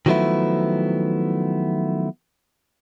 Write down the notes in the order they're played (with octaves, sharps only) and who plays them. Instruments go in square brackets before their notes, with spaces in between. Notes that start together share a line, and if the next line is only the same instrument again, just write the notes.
[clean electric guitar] D#3 F3 F#3 A3 B3 E4